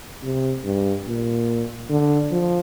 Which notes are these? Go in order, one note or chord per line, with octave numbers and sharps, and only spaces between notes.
C3
G2
A#2
D3
F3